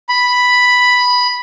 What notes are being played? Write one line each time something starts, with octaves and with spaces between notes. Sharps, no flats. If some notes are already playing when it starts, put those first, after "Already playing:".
B5